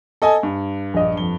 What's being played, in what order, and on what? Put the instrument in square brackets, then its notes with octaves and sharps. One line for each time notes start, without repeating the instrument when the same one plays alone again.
[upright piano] A4 D#5 G#5
G2
[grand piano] A#1 D#5
F2 G7